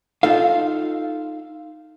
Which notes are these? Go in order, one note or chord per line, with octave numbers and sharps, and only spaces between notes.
D#4 F4 A4 F5